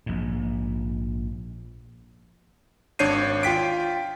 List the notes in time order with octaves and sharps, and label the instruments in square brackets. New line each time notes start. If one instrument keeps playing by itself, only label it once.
[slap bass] A#1 G#2
[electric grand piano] G#1 D4 C#5 G6 C7 D#7
F4 G5 B6 D7